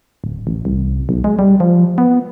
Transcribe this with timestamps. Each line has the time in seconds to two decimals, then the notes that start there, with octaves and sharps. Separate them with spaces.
0.24 D1
0.47 A1
0.65 C2
1.09 B1
1.24 G#3
1.39 G3
1.60 F3
1.98 B3